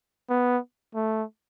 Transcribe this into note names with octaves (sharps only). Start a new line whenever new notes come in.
B3
A3